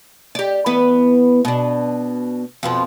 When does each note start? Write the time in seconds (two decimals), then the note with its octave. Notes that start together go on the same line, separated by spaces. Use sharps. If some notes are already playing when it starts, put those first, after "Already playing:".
0.35 G4 D5
0.66 E2 B3 B4
1.45 B2 D4
2.63 F2 B2 F3